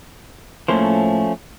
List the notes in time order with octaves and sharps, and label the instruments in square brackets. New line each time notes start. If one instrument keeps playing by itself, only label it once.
[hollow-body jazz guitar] A2 A#3 C5 [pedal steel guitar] F3 A3 C#4